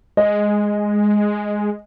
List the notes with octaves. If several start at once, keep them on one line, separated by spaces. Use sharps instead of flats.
G#3 D#5